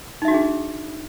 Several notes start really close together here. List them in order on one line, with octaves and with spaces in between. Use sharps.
D#4 E5 F#4 D4 G#4